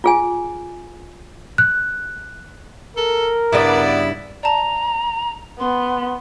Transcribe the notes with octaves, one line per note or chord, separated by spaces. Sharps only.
F4 G#4 G#5
F#6
A4 A#4
G2 C#3 B3 D4 E4 D5
D5 A5 A#5
B3 C6